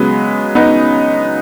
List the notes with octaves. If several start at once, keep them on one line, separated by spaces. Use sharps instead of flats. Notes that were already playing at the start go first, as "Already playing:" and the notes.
Already playing: C#3 F#3 G#3 B3
B3 D#4